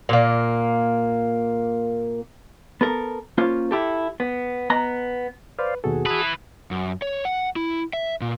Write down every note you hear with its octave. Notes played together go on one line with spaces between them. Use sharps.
A#2 A#3
B3 A4 A#4
A#3 C#4 F4 C5 F5
E4 G4 A4
B3
B3 D#5 A#5
B4 C5 D5 F5
D#2 B2 F#4 G#4 A4
E4 B4 A5 D#6
F#2
C#5
F#5
E4
E5
A#2